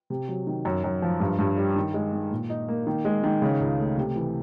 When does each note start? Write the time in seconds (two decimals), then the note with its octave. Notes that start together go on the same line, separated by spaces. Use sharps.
0.10 C3
0.28 F#3
0.47 D#3
0.65 F#2
0.84 F#2
1.02 F3
1.20 G2
1.39 G2
1.58 G3
1.76 D#3
1.94 G#3
2.13 D#3
2.31 A#2
2.50 D#4
2.68 A#3
2.87 D#3
3.05 G#3
3.24 D#3
3.42 C#3
3.60 C#2
3.78 A3
3.98 C3
4.16 E3